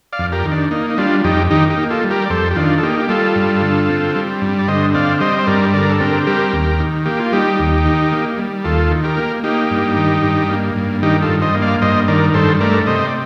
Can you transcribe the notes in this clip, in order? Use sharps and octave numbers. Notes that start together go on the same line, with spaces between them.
D5 F5
F2
G4 A#4
D#3
D4
A#3 D#4
D#4
G3 D4 F4
F2 D#4 G4
D#3 D#4 G4
D#4 G4
A#3
F4 A4
G3
G4 A#4
D5
F2 A4 C5
G4
D#3 D4 F4
A4
A#3 D#4 G4
G4
G3 F4 A4
G2
D3
C4
G3
G2
D5
D3 C5 D#5
C4 D5 F5
G3 C5 D#5
C5
G2 A#4 D5
D3 A#4 D5
A4
C4 G4 A#4
G3 G4 A#4
D#2
D#3
A#3 G4
F4
G3 D#4 G4
D#2
D#3
A#3
G3
D#2 F4 A4
D#3
G4 A#4
A#3
A#3 D#4 G4
G2
D#3
G2
A#3
G2
D#3 D#4 G4
F4 A4
G2
C5 D#5
A#3
D5 F5
G2 C5 D#5
D#3 A#4 D5
G2 A4 C5
A3 A#4 D5
C3 C5 D#5
D5